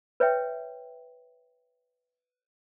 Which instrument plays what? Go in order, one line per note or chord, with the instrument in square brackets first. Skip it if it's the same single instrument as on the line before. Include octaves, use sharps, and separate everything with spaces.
[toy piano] B4 C#5 E5 G5